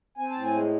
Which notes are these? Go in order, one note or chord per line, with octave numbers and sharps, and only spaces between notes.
C4 G#5
A2 A5
G#5
G#3